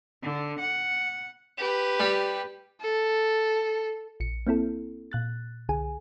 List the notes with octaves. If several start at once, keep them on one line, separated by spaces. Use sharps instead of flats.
D3
F#5
G4 B4
G3
A4
A#1 C#7
A#3 C4 E4 A4
A#2 F#6 A6
C2 D3 G#4 G#5